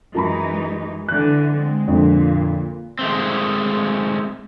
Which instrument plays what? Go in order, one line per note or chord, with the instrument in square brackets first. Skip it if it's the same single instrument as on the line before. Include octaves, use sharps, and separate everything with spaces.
[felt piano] F#2 A#5 B5 [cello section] E3 G#3 D#4
[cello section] D3 E3 [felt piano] F#6
[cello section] G#3 C4
[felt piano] F2 D3 [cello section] A#2
[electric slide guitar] G#3 A3 C4